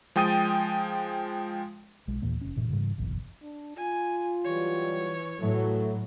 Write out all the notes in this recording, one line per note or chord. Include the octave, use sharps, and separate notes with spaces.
F3 G#3 G5 D#6 A6 D#7
B1 G#3
D#2 A#2 E3 A#3
F1 C#4
F1 G2 A#2 E3
G#2 C#3 E3 G3
F#1 B1 E2
D4
F4 G#5
E3 F#3 G3 C#5
A2 E3 F#3 A3